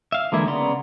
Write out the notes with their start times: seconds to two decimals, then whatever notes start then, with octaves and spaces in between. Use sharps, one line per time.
0.12 E5 F5
0.32 D3 E3 G#3 A#3 E4
0.47 C#3 B3 D5 A#5 C6